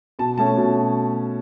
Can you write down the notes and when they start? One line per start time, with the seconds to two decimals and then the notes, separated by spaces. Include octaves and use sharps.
0.19 B2 A5
0.37 A3 C#4 A5
0.57 B2